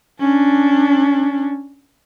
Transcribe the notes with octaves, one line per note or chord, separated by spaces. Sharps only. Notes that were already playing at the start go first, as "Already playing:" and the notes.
C#4 D4